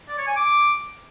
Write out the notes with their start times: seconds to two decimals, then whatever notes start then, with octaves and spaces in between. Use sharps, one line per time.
0.09 D5
0.18 C#5
0.27 G#5
0.36 D6